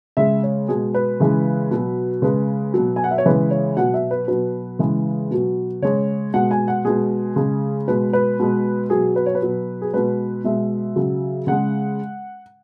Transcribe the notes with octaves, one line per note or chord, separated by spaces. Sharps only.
C#3 G#3 E5
C#5
B2 G#3 G#4
B4
C#3 E3 G#3
B2 F#3
C#3 G#3 B4
B2 F#3
G#5
F#5
E5
C#5
C#3 E3 G#3 B4
C#5
B2 F#3 F#5
E5
B4
B2 F#3 B4
C#3 E3 G#3
B2 F#3
C#3 G#3 C#5
B2 G#3 F#5
G#5
F#5
B2 G#3 G#4
C#3 G#3
B2 G#3 B4
B4
B2 G#3
B2 F#3 G#4
B4
C#5
B4
B2 F#3
G#4
B2 G#3 B4
B2 G#3 E5
C#3 F#3
C#3 G#3 F#5